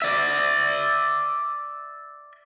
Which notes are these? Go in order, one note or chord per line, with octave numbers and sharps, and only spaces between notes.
D5 E5